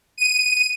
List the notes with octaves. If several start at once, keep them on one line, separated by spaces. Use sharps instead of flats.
D#7